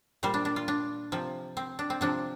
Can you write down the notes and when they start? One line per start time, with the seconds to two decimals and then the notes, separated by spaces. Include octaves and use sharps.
0.23 A#2 G3 C5
0.34 D4
0.45 D4
0.56 F4
0.68 D4
1.12 C3 F3
1.57 C4
1.79 D4
1.90 C4
2.01 C3 F3 D4